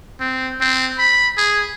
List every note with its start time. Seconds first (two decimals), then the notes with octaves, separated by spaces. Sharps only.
0.20 C4
0.61 C4
0.99 B5
1.37 G#4